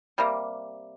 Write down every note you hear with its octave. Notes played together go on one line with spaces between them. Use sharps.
C3 G3 A#3